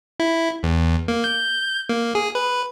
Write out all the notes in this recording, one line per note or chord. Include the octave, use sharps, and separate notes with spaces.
E4
E2
A#3
G6
A#3
G#4
B4